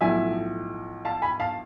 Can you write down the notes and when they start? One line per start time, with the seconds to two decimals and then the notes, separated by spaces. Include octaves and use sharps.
0.01 B1 A2 F3 E5 G#5
1.05 F5 A5
1.22 G#5 B5
1.40 F5 A5